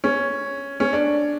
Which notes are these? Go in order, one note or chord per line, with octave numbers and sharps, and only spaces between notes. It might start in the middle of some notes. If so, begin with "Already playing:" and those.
C#4
C#4
D4